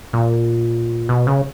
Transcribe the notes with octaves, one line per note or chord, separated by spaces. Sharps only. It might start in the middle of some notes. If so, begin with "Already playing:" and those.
A#2
B2
C#3